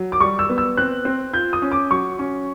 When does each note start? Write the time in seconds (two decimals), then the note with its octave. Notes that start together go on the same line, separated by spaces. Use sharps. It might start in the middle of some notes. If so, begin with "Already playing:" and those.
Already playing: F#3
0.12 D6
0.20 G3 C#6
0.39 E6
0.49 B3
0.58 E6
0.77 C4 F#6
1.05 C4
1.33 F4 G6
1.53 D#6
1.62 C#4
1.72 D6
1.91 F#3 C#6
2.19 C#4